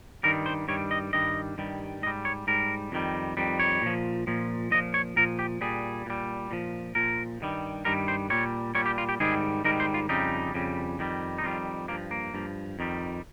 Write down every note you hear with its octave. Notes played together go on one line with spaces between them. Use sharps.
G2 D#3 G3 A#4
C5
G2 D#3 G3 C#5
D#5
G2 D#3 G3 D#5
G2 D#3 G3
G#2 G3 D#5
C#5
G#2 G3 A#4
F2 D#3 G3
F2 D#3 G3
C#5
A#2 F3
A#2 F3
A#2 F3 D#5
C#5
A#2 F3 A#4
G4
A#2 G3 G#4
A#2 G3
A#2 F3
A#2 F3 A#4
G2 D#3 G3
G2 D#3 G3 A#4
C5
A#2 G3 C#5
A#2 G3 C#5
G4
F4
G4
G#2 D#3 G3 G#4
G#2 D#3 G3 A#4
C5
F4
F2 C#3 G3 D#4
F2 C#3 G3
F2 D#3 G3
D#4
F2 D#3 G3 F4
G2 F3 A#3
A#3
G2 F3
F2 D#3 G3